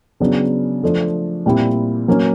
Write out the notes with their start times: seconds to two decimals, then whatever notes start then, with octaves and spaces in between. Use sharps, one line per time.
0.20 C#3 F#3 B3 D4
0.83 F3 A3 D4
1.46 A#2 G3 C4 E4
2.08 F#3 A#3 C#4